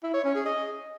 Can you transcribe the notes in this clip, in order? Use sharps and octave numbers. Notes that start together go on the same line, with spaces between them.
E4
C#5
C#4
G#4
D#5